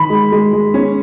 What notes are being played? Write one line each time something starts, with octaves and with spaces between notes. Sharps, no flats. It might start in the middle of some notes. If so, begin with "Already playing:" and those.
Already playing: D#3 B5
G#3
G#3
G#3
C#4